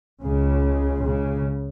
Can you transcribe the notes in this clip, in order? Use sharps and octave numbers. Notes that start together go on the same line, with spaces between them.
C#2 C#3
C#2 C#3